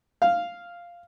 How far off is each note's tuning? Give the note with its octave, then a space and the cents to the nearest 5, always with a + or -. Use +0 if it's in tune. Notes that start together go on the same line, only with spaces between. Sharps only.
F5 -5